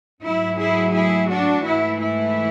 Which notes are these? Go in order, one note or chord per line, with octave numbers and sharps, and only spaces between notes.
G#2 F#3 A3 E4
E4 G#4
E4 G#4
D4 F#4
G#2 E3 A3 E4
E4